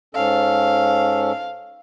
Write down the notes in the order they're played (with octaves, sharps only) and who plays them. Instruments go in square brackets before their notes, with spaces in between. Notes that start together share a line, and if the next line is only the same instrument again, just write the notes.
[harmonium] G#2 C#4 A4 [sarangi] F5